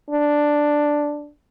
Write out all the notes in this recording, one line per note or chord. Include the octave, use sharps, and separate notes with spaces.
D4